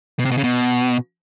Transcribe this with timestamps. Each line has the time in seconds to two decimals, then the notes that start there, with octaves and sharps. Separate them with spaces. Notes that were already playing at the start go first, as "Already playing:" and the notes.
0.19 B2
0.25 C3
0.31 B2
0.38 C#3
0.44 B2